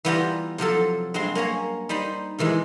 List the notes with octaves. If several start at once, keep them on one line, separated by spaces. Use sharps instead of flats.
E3 G3 B3 F4 G4 A#5
C3 F3 F#3 A4
G2 F#3 G#3 C4 C6
A#3 C#4 C#5 A#5
G3 D#4 C5 B5
C3 D#3 E3 G#3